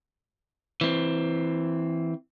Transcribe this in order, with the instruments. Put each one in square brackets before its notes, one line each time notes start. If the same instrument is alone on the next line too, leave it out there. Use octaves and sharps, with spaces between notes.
[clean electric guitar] E3 C4